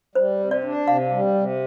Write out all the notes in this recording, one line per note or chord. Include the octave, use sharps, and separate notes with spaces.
G3 C5
C3
D5
D4
C3 F5
G3
C3